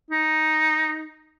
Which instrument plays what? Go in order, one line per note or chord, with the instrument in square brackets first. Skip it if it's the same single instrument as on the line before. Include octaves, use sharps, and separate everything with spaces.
[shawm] D#4